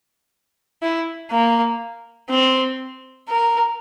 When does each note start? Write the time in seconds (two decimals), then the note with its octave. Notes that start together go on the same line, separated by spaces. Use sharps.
0.82 E4
1.31 A#3
2.30 C4
3.29 A#4